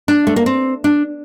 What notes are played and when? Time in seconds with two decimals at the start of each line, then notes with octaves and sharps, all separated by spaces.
0.08 D4
0.27 A3
0.36 A#3
0.46 C4
0.84 D4